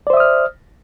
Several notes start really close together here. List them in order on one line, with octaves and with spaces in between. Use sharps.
D5 C5 E5 D#6 F6